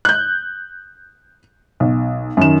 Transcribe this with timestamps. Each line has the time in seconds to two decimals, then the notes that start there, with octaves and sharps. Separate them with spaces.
0.05 F#6 G6
1.80 B1
2.37 F#2 D#3 E7